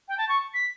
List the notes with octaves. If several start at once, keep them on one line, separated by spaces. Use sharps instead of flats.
G5
A5
C#6
B6